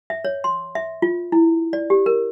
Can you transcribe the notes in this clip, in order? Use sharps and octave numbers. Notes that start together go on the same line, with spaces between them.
E5
C#5
C6
E5
F4
E4
D5
G4
A#4